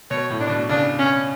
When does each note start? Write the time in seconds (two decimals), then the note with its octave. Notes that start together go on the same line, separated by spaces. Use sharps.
0.10 B2 C#5
0.30 A2
0.40 D4
0.50 B2
0.69 C#3 D4
0.99 C#4